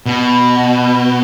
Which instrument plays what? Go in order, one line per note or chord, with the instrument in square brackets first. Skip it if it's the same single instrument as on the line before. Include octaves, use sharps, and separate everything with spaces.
[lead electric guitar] B2